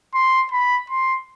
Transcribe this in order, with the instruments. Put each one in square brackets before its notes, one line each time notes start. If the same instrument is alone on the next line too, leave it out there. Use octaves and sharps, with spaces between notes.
[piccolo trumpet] C6
B5
C6